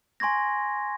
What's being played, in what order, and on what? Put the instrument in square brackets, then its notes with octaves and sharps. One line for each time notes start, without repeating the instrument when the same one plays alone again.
[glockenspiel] G#5 C6 C#6 G#6 A#6